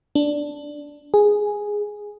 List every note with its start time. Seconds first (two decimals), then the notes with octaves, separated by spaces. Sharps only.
0.15 D4
1.14 G#4